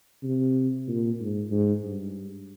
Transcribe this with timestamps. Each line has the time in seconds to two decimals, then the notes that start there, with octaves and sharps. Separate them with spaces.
0.23 C3
0.88 A#2
1.19 G#2
1.50 G#2
1.83 G2